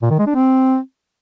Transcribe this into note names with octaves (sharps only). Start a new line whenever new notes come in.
A#2
D#3
G#3
D4
C4